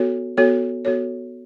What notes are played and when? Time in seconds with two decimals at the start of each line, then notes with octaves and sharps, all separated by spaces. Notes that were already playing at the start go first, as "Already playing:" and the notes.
Already playing: B3 F#4 A4 C#5
0.37 B3 F#4 A4 C#5
0.85 B3 F#4 A4 C#5